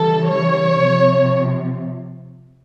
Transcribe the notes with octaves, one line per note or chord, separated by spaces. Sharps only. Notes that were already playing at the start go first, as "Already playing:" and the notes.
Already playing: C#3 E3 G3 A4
C#5
C3 F3